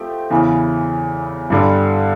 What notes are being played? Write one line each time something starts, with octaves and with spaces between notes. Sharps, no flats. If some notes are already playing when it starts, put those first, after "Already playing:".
Already playing: F3 A3 C4 G4
E2 C#3 E3
G2 D3 G3